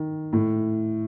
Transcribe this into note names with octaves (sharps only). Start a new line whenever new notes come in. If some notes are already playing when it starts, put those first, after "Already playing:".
Already playing: D#3
A2